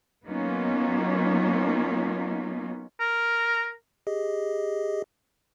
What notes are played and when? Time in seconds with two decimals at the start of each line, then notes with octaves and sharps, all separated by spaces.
0.26 F#3 A#3 B3 C#4 D#4 F4
3.00 A#4
4.07 G4 G#4 D#5